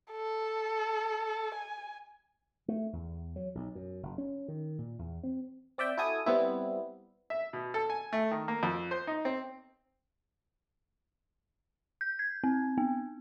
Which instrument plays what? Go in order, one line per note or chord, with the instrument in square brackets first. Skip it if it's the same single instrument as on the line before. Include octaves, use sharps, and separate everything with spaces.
[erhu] A4
G#5
[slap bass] A3
E2
F#3
B1
F#2
F#1
C#4
D#3
A#2
E2
C4
[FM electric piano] C4 D5 E5 G5
E4 F#4 A4 G#5 D#6
G3 B3 C4 E4
[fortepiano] E5
B2
A4
G#5
A3
D#3
A#3
F2
C5
D#4
C4
[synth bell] G6
G#6
C4
B3